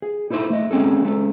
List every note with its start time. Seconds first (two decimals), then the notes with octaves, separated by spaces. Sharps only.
0.02 G#4
0.30 D#4 E4 A4 C5 C6
0.50 A3 D#5
0.71 G#3 C4 C#4 G#4 A4
1.04 G#3 C#4 A4